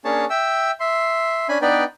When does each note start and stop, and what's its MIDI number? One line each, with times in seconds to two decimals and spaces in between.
0.05 0.25 58
0.05 0.25 61
0.05 0.25 62
0.05 0.25 68
0.05 0.25 73
0.05 0.25 81
0.30 0.71 76
0.30 0.71 79
0.30 0.71 88
0.80 1.48 76
0.80 1.48 84
1.49 1.58 61
1.49 1.58 62
1.49 1.58 80
1.49 1.58 83
1.62 1.84 59
1.62 1.84 62
1.62 1.84 63
1.62 1.84 71
1.62 1.84 74
1.62 1.84 79